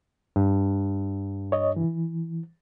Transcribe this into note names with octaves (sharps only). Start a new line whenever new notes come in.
G2
C#5 D#5
E3